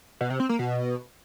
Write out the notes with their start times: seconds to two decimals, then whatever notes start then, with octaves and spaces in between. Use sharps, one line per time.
0.21 B2
0.30 C3
0.40 C4
0.49 A#3
0.59 B2